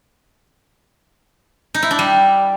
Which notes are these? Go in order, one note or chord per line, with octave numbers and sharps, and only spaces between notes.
D#4
E4
D4
G3